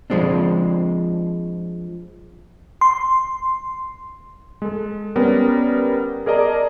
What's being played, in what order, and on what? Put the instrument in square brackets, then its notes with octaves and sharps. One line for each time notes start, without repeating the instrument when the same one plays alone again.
[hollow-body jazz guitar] F3 G#3 C4 D4
[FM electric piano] C6
[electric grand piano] G#3 A4
G3 B3 C#4 A#4
G#4 A#4 D5 D#5 A5 A#5